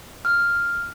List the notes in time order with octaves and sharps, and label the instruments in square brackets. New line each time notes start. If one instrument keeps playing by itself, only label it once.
[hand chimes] F6